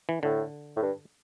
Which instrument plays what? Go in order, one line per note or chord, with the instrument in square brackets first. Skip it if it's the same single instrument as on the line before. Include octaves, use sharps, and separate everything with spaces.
[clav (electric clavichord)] E3
[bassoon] A2 [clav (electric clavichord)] D3
[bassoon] A2
G2